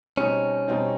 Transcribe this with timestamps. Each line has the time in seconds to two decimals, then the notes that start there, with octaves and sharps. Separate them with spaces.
0.17 B2 G3 C4 C#4 D#4
0.68 B2 G3 C4 D#4